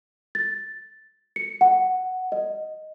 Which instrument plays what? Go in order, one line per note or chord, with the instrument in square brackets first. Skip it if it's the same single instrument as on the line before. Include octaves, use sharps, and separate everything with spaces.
[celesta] A6
C#7
F#5
D#5